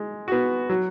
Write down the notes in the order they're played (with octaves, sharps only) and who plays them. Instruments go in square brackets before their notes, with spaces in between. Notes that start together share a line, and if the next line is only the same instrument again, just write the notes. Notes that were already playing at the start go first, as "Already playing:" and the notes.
Already playing: [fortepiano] G#3
B3 F#4
F#3